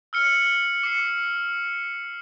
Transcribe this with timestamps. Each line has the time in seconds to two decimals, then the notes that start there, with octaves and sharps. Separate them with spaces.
0.13 E6 F6 C#7
0.83 D6 C7 C#7